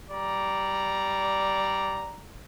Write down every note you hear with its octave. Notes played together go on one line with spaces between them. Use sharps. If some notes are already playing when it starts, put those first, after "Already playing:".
G3 D5 A#5